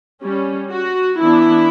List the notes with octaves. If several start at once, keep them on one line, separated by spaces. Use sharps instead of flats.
G3 C#4
F#4
E3 B3 D4 E4